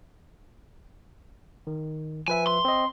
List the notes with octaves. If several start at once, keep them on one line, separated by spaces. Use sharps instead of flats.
D#3
F3 B4 E5 G#5
C6
C4 D#5